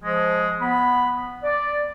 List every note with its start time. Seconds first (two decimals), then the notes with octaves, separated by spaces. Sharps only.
0.03 F3 G#3
0.61 B3 B5
1.44 D5